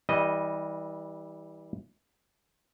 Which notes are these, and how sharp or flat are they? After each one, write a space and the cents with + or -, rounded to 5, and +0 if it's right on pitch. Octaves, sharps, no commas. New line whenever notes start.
E3 -30 G3 +0 D#5 +0